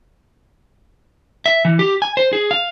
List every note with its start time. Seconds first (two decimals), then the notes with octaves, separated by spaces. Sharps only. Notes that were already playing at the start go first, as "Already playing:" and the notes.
1.46 E5
1.65 E3
1.79 G4
2.02 G#5
2.17 C5
2.33 G#4
2.51 F5